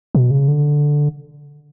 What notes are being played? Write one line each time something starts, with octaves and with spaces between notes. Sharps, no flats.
B2
C#3
D3